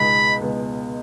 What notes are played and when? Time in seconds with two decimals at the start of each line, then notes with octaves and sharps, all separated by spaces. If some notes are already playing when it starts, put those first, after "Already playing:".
Already playing: C#2 B2 G#3 B3 D#4 B5
0.41 C#2 B2 G#3 B3 D#4